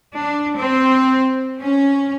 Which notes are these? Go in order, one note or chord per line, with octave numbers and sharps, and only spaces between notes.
D4
C4
C#4